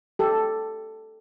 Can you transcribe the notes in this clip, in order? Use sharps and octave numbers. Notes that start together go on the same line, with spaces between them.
G4 A4